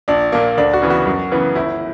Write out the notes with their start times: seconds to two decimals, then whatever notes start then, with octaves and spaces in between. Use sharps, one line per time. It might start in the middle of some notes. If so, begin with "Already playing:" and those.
0.08 A#1 D4
0.32 A#2 A#3
0.57 D2 D4
0.73 F#4
0.82 C#3 E3 B3
0.90 F#4
1.06 F#2 F#4
1.32 C#3 E3 B3
1.55 G1 E4